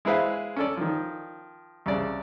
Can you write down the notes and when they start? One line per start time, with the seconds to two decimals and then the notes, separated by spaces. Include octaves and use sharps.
0.05 G#3 E4 G#4 B4 C5 F5
0.56 C#4 A4 D5
0.77 D#3 F3
1.86 C2 C#3 D5